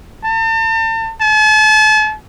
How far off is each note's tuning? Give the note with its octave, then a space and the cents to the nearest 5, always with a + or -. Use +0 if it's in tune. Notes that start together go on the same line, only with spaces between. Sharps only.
A5 +40
A5 -40